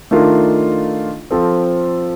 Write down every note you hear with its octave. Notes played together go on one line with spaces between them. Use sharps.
D#3 A3 D4 F4 A#4
F3 C4 F4 A4